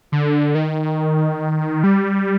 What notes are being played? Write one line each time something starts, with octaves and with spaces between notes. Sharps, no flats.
D3
D#3
G3